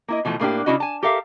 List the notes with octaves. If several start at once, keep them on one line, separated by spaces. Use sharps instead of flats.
A#3 E4 D#5
B2 E3 F3 A3
A2 A#3 D4 G4
C#3 B3 D4 E4 F#4 D#5
G#5 A5
G4 A4 A#4 E5 F5